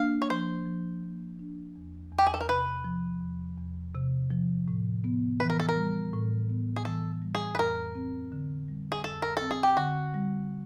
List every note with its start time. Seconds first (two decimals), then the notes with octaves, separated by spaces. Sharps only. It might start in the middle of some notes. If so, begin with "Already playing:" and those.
Already playing: A#3 D4 F5
0.22 C#5
0.30 F3 C5
0.66 F3
1.03 A#3
1.39 D4
1.76 E2
2.12 E2
2.18 G4
2.27 G#4
2.34 A4
2.41 A#4
2.48 C3 B4
2.84 F3
3.22 E2
3.58 E2
3.95 C3
4.31 F3
4.68 A2
5.04 B3
5.40 E3 B4
5.50 A#4
5.60 A4
5.69 A#4
5.77 G3
6.13 A2
6.49 B3
6.76 G#4
6.85 E3 A4
7.22 G3
7.35 G#4
7.55 B4
7.58 F2 A#4
7.95 C4
8.32 D3
8.68 G3
8.92 G#4
9.04 F2 A4
9.22 A#4
9.37 C4 A4
9.51 G#4
9.63 G4
9.77 D3 F#4
10.14 G3